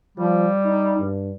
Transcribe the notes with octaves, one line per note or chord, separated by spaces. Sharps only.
F3 G3
D#4
G2